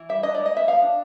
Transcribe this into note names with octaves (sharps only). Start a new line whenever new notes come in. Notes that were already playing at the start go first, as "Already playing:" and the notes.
Already playing: E3
G3 E5
D4 D#5
G#3 D5
D#5
B3 E5
F3 F5
D4